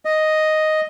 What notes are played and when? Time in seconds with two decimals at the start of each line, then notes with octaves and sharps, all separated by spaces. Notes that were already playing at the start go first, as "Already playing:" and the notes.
0.05 D#5